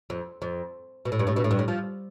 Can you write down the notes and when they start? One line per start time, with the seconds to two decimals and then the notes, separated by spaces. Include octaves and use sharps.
0.10 F2
0.42 F2
1.05 B2
1.12 A2
1.19 G2
1.27 A2
1.36 B2
1.44 A2
1.51 G2
1.59 A2
1.68 F3